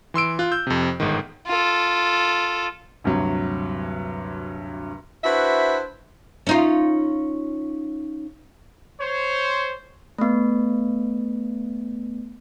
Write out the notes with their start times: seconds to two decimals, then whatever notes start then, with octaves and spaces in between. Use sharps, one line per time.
0.14 E3 C6 E6 D7
0.39 F4 F#6
0.52 E6 G6
0.67 F2 C3
1.00 G1 G#2 D#3
1.47 F4 A4
3.04 D2 G2 C3 F#3
5.24 D4 E4 F#4 B4 C5 E5
6.47 C#4 D#4 F4
9.00 C5 C#5
10.19 A3 B3